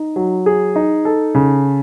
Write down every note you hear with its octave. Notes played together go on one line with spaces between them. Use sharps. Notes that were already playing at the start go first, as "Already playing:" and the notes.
Already playing: D#4
F#3
G#4
D#4
A4
C#3